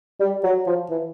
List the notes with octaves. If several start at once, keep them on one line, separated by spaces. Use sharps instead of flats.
G3
F#3
F3
E3